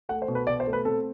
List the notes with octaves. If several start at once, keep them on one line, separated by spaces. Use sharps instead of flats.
A3 F#5
C5
B2
B4
B2 D5
C5
A3
B4
C4 A4